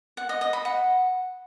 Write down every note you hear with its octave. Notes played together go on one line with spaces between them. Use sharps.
F#5
D#5
D#5
B5
F#5